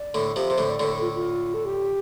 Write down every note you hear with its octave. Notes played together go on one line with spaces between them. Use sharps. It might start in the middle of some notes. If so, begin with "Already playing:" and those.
Already playing: D5
A2 D3
C3 F3 G4
C3 C5
A2 D3
D5
A2 D3
A4
F4
F4
A4
G4